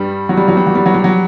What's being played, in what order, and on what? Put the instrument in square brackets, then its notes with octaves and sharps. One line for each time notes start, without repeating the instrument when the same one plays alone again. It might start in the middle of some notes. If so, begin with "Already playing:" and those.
Already playing: [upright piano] G2 G3
F#3
G3
F#3
G3
F#3
G3
F#3
G3
F#3